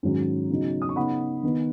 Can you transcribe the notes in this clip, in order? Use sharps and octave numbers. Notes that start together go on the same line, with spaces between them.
G#2 D#3 F#3 C#4
C#3 F#3 B3 D#4
D#6
C#6
C#3 B3 D#4 F#5 B5
D#3 B3 D#4